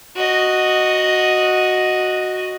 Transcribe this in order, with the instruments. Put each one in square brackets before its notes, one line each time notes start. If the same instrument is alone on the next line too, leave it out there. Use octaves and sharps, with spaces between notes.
[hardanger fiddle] F#4 D#5